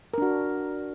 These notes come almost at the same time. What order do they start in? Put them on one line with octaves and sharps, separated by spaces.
A#4 D4 F#4